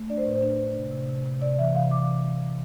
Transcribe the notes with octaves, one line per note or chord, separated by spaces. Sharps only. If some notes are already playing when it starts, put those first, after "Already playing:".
Already playing: A3
D4 D5
C5
A2 B4
C5
D4
D4
C3
C3
C3
C3
C3 D5
E3 E5
C3 F5
D6